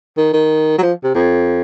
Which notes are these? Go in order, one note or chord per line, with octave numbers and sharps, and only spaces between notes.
D#3
D#3
F#3
F3
C3
F2